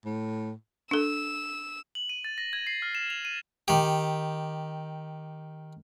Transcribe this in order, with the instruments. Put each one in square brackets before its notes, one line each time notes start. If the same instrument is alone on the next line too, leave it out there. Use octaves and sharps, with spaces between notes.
[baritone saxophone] A2
[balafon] D4 A4 [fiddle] E6
[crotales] F#7
D#7
A6
A#6
G#6
C7
F6
E7
F7
D#7
[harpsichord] D#3 G4